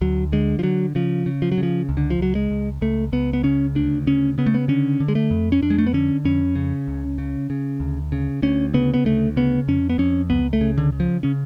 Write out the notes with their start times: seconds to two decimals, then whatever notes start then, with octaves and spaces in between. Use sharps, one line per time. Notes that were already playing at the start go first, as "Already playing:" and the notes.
0.01 D2 F#3
0.32 D3 G#3
0.59 F3
0.63 D3 F#3
0.95 C#3 F3
1.26 C#3
1.42 F3
1.52 F#3
1.58 C#3
1.63 F3
1.89 C#2
1.97 D3
2.10 F3
2.19 C#2 F#3
2.35 G#3
2.50 C#2
2.81 C#2 A3
3.12 C#2 B3
3.33 B3
3.43 C#3 C#4
3.75 D2 D4
4.07 C#3 C#4
4.38 C#3 B3
4.46 A3
4.54 B3
4.68 D3 C#4
5.00 D3
5.08 G#3
5.15 A3
5.31 F2
5.52 C#4
5.62 F2 D4
5.70 G#3
5.78 A3
5.87 B3
5.93 D3 C#4
6.25 F2 C#4
6.56 C#3
6.88 C#2
7.18 C#3
7.50 C#3
7.80 D2
8.12 C#3
8.43 D2 C#4
8.74 C#3 B3
8.94 B3
9.05 D2 A3
9.37 C#3 B3
9.68 F2 C#4
9.90 B3
9.98 F2 C#4
10.30 C#2 B3
10.53 A3
10.61 C#3
10.78 D3
10.92 C#3
11.00 F3
11.23 C#3 C#4